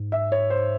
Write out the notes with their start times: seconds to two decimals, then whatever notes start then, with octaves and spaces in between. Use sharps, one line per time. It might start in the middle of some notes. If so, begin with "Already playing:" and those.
Already playing: G#2
0.12 E5
0.32 C#5
0.50 C5